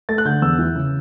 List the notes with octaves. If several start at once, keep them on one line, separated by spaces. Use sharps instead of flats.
A3 A6
F#6
D3 G6
E2 E6
E3
C#3